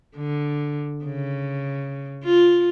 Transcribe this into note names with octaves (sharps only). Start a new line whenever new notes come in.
D3
C#3
F4